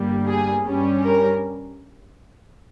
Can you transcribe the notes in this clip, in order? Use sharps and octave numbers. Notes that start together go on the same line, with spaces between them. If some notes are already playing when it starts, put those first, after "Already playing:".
Already playing: G1 G2 G3 A#3
G#4
G2 G3 C#4
A#4